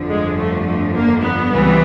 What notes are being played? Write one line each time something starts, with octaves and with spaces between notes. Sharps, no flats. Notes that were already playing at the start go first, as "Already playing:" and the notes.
Already playing: G1 F2 D3 F3
G#3
A3
A3
A#3
B3
C#2 C3 E3 G3